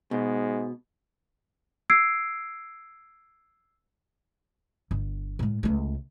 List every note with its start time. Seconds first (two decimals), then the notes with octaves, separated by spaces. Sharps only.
0.11 G#2 B2
1.90 E6 G#6 C7 D7
4.91 G1
5.39 A2 G#3
5.63 C#2 A3